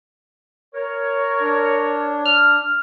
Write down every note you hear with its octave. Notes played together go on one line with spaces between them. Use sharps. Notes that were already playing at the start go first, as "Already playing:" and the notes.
A#4 C#5
D4
F6